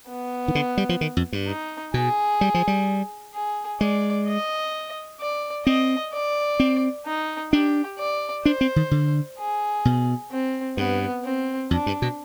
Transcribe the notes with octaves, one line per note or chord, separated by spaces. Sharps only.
B3
D#3
D3
G3
F3
D#3
F2
G2
D#4
B2 G#4
G3
F3
G3
G#4
G#3 D5
D#5
D5
C4 D#5
D5
C4
D#4
D4 G4
D5
D4 C5
C4
D#3
D3
G#4
B2
C4
G2 B3
C4
F2 D4
G2
B2